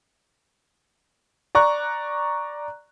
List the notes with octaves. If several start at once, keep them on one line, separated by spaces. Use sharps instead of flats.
D5 A#5 C#6 F#6